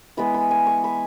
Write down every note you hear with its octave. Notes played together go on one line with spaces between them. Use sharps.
E3 G#3 B3 B5
B5
G#5
C#6
B5